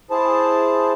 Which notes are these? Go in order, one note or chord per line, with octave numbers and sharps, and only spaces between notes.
E4 G#4 C5 A5